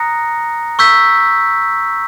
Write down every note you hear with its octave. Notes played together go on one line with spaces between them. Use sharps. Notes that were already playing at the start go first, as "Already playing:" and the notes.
Already playing: A#5 D#6 F#6 A#6 C#7
C#6 E6 G6 B6